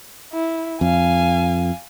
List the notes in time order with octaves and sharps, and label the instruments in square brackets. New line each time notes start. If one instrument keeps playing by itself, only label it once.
[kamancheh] E4
[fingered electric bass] F2 [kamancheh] F5 G#5